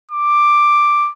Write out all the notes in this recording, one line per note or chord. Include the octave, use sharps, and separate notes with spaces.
D6